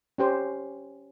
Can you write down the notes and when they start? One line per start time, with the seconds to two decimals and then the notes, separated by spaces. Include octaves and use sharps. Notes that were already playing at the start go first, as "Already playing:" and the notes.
0.18 C#4 G4 C5